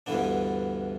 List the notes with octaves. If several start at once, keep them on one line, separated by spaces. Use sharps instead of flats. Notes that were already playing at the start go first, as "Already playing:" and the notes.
D2 G2 D3 E3 B3 D4